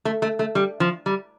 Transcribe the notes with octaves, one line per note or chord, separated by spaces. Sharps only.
A3
A3
A3
G3
F3
G3